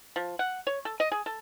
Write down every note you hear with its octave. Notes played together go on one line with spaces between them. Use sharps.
F3
F#5
C#5
A4
D#5
G#4
A4